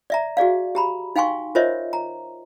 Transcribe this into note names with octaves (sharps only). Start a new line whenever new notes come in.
D5 E5 A#5
F#4 G#4 D5 F5
G4 A#5 B5
D#4 F5 G5 G#5 C6 C#6
F4 A#4 C5 C#5 D#5 E5
A#5